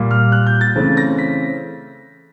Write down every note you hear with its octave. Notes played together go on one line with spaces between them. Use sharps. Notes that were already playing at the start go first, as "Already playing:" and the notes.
Already playing: A#2 G3 A#3
F6
F#6
G6
A6
C#3 E3 A3 C4
A#6
B6